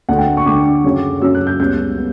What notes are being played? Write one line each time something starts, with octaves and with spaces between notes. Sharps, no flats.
D2 D3 A3 F#5
G5
C#6
D2 D3 A3 D6
F#2 C#3 F#3 C#4
F#2 C#3 F#3 C#4 E6
F#6
G6
C#2 C#3 G3 B3 G6
B3